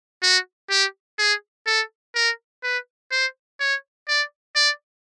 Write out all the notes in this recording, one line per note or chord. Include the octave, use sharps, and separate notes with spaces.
F#4
G4
G#4
A4
A#4
B4
C5
C#5
D5
D5